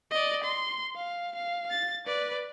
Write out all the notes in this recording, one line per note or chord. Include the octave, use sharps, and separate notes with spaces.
D5 D#5
C6
F5
F5
A6
B4 D5